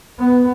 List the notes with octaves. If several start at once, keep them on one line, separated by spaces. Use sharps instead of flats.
B3